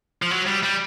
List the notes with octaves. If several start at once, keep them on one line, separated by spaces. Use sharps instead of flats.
F3
F#3
G3
G3